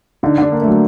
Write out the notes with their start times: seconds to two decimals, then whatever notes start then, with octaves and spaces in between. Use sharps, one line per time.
0.23 D3 D#4
0.38 D3 D4
0.52 A#3
0.62 A3
0.67 F#3